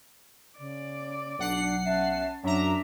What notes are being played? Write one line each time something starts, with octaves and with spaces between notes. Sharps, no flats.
C#3 D5
B1 D4 F#5 C7
C#4 E5 A5
F#2 F#3 D4 E5 A#5